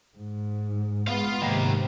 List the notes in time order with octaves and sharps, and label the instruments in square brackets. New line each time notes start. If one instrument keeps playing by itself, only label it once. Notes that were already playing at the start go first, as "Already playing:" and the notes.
[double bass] G#2
[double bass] G#3 B3 [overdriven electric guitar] F4 F5
[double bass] G#2 C3 [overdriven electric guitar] D#3 A#3